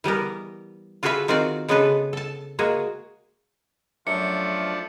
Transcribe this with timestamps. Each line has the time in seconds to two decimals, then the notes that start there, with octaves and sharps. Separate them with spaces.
0.04 E3 G3 B3 A#4
1.03 F4 F#4 G#4 A4 B4 E5
1.28 D#3 C4 F4 F#4 D5
1.68 C#3 G#3 B3 D4 A4 B4
2.13 A4 A5
2.59 G#3 A#3 F#4 G#4
4.07 F#2 F3 A3 D4 C#7